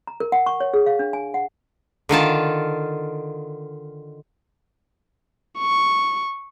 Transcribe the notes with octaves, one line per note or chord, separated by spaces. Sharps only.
A#5
A#4
F#5
C#6
C#5
G#4
F5
D4
G#5
F#5
D3 D#3 F4 A5
C#6